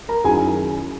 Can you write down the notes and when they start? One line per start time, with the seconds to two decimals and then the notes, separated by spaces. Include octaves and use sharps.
0.08 A#4 A#5
0.24 F#2 D#3 F#3 C#4 E4 G#4 G#5